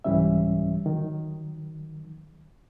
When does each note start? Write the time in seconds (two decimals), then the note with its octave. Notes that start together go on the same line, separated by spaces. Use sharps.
0.04 C2 G#2 E3 G3 C#4 E5
0.86 D#3 F#3